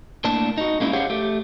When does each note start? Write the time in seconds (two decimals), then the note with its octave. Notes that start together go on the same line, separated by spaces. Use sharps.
0.24 A2 A#3 D4 A5
0.58 D#4 F#4
0.80 G#3 A#3 C#4 D#4 E4
0.93 G4 G#4 C5 C#5 F5 F#5
1.09 A3 G4